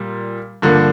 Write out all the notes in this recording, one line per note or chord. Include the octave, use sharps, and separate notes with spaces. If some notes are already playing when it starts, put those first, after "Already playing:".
Already playing: A#2 G3
G2 D3 F3 A#3